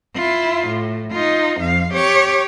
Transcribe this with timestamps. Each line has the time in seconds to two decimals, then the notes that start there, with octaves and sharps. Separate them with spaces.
0.15 E4 F4
0.68 A2
1.12 D#4 F4
1.61 F2 F5
1.93 G4 C#5